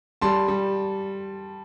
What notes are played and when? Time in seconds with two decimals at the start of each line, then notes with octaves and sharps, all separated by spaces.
0.21 G3 A5 C6
0.48 G3